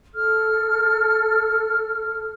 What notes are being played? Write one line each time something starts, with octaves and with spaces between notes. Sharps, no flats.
A4 F6